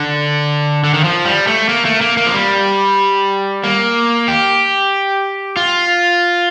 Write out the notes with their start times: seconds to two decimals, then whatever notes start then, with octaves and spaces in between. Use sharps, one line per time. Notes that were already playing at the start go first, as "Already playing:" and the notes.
Already playing: D3
0.84 D3
0.94 D#3
1.04 F3
1.25 G3
1.47 A3
1.69 A#3
1.85 A3
2.01 A#3
2.17 A#3
2.27 F3
2.34 G3
3.64 A#3
4.28 G4
5.57 F4